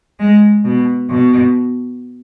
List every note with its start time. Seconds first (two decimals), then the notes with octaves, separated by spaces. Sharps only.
0.20 G#3
0.65 B2
1.10 B2